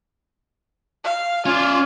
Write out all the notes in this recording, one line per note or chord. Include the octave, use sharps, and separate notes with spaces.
F5
C#4 F4 D5